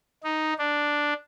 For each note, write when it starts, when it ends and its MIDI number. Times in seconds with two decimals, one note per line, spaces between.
0.24 0.53 63
0.58 1.13 62